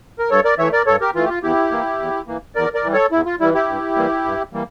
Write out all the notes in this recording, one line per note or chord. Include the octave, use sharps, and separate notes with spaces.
A#4
G2 A4 C#5
A#4 D5
E3 A3 C#5 E5
A#4 D5
G2 A4 C#5
G4 A#4
E3 A3 F4
G4
F4
E2 E4 G4
E3 A#3
E2
E3 A#3
E2 A#4 D5
A#4 D5
E3 G3
A4 C#5
E2 E4
F4
E3 G3 E4
E4 G4
G2
E3 G3 A#3
G2
E3 G3 A#3